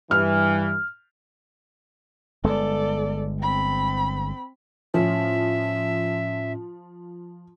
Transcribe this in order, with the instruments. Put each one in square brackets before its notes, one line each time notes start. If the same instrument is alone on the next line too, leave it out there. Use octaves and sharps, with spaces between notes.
[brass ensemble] G2 E3 [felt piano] F6
[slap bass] G1 G#3 B3 [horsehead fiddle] A4 D5
[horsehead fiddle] C4 B5
[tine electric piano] A2 C#4 [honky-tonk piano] F3 [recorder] E5